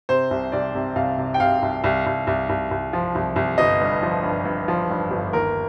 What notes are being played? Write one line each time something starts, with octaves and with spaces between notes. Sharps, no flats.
C3 C5
C2
C2 D5
C3
C2 F5
C3
G5
C3 F5
C2
C2
C2
C2
C2
C2
F3
C2
C2
G1 D#5
G2
F3
G2
G2
F3
G2
G1
D#2 A#4